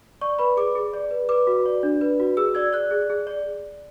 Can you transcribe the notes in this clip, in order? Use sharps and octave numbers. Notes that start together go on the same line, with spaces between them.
D5 C#6
B4 B5
G#4 D6
G#4
D5
B4
B4 D6
F#4
D5
D4
B4
F#4
G#4 E6
D5 G#6
D5 F#6
G#4
G#4
D5